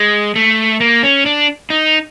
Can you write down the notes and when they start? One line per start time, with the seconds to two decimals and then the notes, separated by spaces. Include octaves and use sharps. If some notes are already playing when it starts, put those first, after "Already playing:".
Already playing: G#3
0.36 A3
0.80 A#3
1.03 C#4
1.26 D4
1.70 D#4